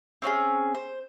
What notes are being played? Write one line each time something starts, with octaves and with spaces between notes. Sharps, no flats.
C4 C#4 F4 G#4
C5